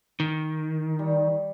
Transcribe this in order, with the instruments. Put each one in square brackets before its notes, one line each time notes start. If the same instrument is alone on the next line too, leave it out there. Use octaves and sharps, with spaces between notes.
[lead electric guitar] D#3
[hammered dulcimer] G3